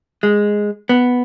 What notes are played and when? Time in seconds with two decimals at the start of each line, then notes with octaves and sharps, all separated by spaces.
0.23 G#3
0.89 B3